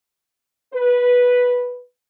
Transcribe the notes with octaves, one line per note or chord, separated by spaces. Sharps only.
B4